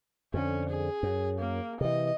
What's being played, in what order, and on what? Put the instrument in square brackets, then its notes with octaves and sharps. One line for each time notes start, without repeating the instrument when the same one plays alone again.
[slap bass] F2 D3 [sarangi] C#4
[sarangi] G#4
[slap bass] F#2
[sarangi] A#3
[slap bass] C3 E3 [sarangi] D#5